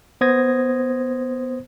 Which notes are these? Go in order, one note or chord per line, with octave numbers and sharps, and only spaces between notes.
B3 C5 D#6 G#6 A#6